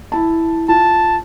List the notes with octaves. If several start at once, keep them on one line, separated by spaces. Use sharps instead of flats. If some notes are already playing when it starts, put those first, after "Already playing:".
E4 A5
F4 A5